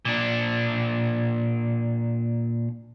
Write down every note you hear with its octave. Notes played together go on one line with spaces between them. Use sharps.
A#2 D4